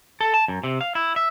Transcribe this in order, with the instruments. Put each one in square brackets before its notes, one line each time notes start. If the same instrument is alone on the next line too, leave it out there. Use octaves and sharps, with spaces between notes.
[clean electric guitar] A4
A5
F#2
C3
F5
E4
E5